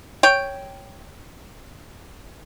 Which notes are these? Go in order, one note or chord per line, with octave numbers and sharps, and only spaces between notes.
C#5 G5